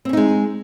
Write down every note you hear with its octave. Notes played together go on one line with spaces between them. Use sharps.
G#3 C4 C#4 D#4